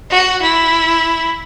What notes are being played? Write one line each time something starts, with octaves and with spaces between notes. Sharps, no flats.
F#4
E4